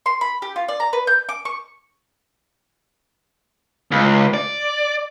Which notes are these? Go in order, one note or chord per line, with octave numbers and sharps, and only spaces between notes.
C6
B5
G4
F4
D5
A#5
B4
G6
D6
C#6
C#2
D5